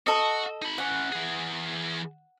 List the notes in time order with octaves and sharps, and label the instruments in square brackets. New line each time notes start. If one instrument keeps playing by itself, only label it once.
[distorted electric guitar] F#4 [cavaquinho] A4 D#5
[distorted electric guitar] D#4 B5
[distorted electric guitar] E3 C#4 [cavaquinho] F#5
[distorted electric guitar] E3 G#4